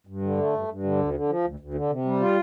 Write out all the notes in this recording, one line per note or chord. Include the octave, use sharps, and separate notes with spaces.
G2
D3
A3
G2
G2
D3
D2
D3
F3
D2
D2
D3
C3
G3
F4